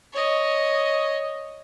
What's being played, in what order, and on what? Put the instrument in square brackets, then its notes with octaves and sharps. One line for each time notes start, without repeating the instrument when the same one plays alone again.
[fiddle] C#5 D#5